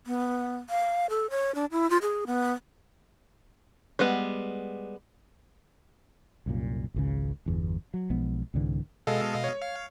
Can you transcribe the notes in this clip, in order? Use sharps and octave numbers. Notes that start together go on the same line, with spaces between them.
B3
F5
A4
C#5
D4
E4
F4
G#4
B3
G3 G#3 B3 F#5
C2 F#2 A#2
G#1 C#2 C#3
G1 E2
F#3
B1 F3 G#3 B3
C2 G#2 D3 E3
B2 G#3 A4 D#5 F5
C#5
F5